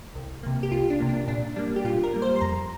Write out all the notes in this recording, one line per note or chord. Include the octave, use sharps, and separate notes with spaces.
C2
C3 A#3
G4
C2 F4
D4
C3 A#3
D4
A#2 D4
G3 A#3 D4
G4
A#2 F4
A#4
G3 A#3
C5
C6
F2 A#5